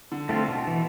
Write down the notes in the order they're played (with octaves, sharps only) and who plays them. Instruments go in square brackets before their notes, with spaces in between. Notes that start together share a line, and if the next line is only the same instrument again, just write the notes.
[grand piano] D3
[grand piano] D3 [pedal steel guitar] A3 C4 F4
[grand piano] B2
[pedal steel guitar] E3